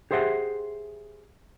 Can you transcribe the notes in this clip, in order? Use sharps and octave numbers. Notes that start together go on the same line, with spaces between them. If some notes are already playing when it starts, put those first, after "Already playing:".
G4 G#4 C5 E5 F#5